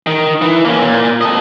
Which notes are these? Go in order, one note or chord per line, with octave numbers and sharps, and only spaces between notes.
D#3
E3
A#3 C#4
A#2
A4 D#5